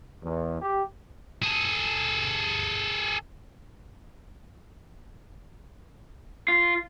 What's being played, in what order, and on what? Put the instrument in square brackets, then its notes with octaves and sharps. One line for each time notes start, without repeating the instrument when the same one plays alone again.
[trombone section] E2
G4
[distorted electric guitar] G#4 A4
[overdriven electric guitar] F4